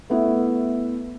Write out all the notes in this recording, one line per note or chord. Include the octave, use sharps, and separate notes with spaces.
A3 B3 E4